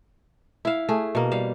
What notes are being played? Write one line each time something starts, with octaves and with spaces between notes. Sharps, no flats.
E4 F5
A3 G#4
B2 A#3
G3 F5